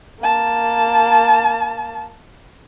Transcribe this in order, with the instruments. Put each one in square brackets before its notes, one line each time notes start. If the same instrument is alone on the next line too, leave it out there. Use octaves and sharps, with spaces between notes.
[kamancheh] A#3 A5